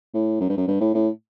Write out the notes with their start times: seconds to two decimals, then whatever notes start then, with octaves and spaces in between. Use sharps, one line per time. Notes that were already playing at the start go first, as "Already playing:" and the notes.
0.14 A2
0.41 F#2
0.49 G2
0.57 F#2
0.68 G2
0.80 A2
0.94 A2